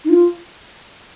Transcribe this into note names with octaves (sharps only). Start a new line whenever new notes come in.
D#4
F4